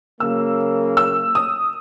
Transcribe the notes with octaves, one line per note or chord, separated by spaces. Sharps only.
C#3 F#3 A#3 E6
E6
D#6